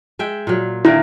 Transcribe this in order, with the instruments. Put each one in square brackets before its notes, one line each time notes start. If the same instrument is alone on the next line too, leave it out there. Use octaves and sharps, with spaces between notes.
[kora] G#3 E5 G5
A#2 F#3
[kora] D3 D#3 A#3 [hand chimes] E4